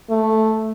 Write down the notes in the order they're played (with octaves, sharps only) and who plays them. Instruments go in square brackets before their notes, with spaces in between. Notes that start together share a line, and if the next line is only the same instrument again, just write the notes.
[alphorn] A3